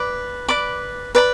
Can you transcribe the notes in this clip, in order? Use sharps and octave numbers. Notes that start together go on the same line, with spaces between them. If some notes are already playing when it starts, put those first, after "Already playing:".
Already playing: B4 D5 B5 D6
B4 D5 B5 D6
B4 D5 B5